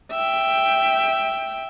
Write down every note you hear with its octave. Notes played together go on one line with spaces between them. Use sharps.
E5 G5